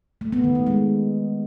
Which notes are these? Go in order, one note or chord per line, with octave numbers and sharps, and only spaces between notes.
A3
B3
D#3
A3
G#3